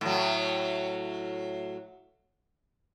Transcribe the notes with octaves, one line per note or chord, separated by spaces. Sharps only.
A2 F#3